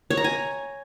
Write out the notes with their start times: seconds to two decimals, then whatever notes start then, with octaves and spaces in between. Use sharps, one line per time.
0.10 C#5
0.17 A#5
0.24 G#5